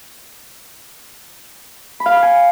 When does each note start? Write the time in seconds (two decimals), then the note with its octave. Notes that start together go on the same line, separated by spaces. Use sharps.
2.00 B5
2.06 F5
2.11 B5
2.17 F6
2.22 G#5